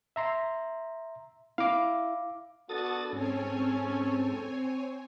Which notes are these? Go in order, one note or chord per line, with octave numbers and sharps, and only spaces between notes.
E5 A#5 C6
E4 F5 D6
B3 D4 F#4 A4 D#6 A6
G#2 C4 C#4 A4 C#5 G#5